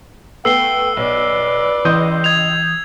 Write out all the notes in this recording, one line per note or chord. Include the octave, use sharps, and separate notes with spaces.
A3 B3 G5 E6 C7 G7
B1 B4 D5
C#2 E3 D#5 C6 D#6 G6
G#6 F7